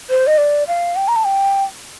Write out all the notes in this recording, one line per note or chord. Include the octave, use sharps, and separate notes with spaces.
C5
D#5
D5
F5
G5
A#5
A5
G5